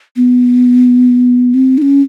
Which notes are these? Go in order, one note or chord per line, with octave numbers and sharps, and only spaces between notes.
B3
C4
D#4
C#4